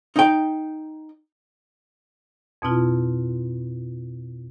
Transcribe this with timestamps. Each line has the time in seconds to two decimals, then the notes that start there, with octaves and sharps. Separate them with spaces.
0.16 D#4 G5
2.62 F2 B2 C4 E4 F4